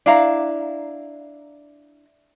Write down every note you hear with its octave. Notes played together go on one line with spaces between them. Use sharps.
D4 E4 F5 A#5